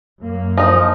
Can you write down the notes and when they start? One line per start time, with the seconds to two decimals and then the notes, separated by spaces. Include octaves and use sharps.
0.22 F#2 A#3
0.57 F3 D#4